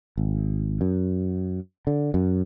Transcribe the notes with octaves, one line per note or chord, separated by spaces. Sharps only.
G#1
F#2
D3
F#2